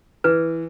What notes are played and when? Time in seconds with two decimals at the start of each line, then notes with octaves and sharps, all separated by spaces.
0.24 E3 B4